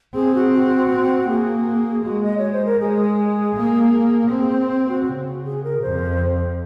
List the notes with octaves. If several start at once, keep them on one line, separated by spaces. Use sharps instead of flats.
C4 G#4
F#4
F#4
C4
A#3 G#4
G#3 F#4
D#5
C#5
C5
A#4
G#3 G#4
A#3
C4
C5
C5
F#4
C#3
G#4
A#4
F2 C5